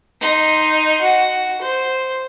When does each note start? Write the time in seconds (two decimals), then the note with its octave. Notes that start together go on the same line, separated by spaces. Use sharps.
0.20 D#4 C6
1.01 F#4
1.61 C5